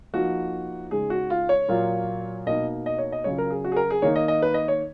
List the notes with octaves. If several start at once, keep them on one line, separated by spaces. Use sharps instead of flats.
F3 A#3 D#4 F#4
C#3 G#3 D#4 G#4
F#4
F4
C#5
A#2 F#3 A#3 F4
B2 A#3 D#4 D#5
D#5
C#5
D#5
C#3 F#3 C#4 F4 C#5
A#4
G#4
F#4
G#4
A#4
G#4
D#3 A#3 D#4 C#5
D#5
D#5
B4
D#5
C#5